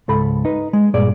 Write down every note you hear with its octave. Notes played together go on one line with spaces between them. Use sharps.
C#2 G#2 A4 B5
D#4 B4
G#3
G2 A#2 G#4 D5